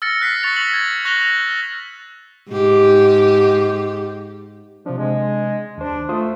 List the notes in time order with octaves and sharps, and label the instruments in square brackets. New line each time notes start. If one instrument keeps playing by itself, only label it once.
[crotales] E6 F6 A6 A#6 C#7
F#6 B6 C7
C#6 A6 F7
B6 F#7
G#6 A6
C#6 F#6 A#6 F7 G7
[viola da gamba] G#2 G4
[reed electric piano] C3 D4 [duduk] F3
[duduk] G#3
[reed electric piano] D#2 C5 [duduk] D4
[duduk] A3 [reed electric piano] F4 C5 D#6